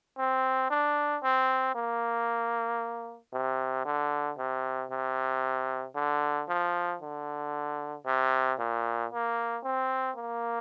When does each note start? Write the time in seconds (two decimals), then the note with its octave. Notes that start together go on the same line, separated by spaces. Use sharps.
0.18 C4
0.70 D4
1.23 C4
1.75 A#3
3.33 C3
3.85 D3
4.38 C3
4.91 C3
5.95 D3
6.49 F3
7.01 D3
8.06 C3
8.59 A#2
9.11 A#3
9.64 C4
10.16 A#3